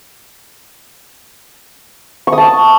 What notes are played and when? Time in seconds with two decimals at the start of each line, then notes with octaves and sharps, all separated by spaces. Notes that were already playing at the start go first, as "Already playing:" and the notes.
2.27 C#6
2.32 D#6
2.38 A5